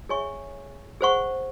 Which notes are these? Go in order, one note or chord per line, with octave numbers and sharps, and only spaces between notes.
G#4 C#5 E5 G#5 C#6
G#4 C5 F#5 C#6